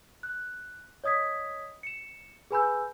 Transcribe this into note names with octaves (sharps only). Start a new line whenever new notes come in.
F#6
C#5 D#5 D#6 G#6 B6
C#7 E7
G#4 B4 G#5 B5 E6 G6